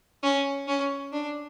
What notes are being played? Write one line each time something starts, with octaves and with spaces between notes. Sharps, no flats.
C#4
C#4
D4